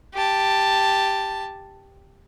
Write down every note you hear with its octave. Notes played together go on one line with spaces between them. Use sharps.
G4 A5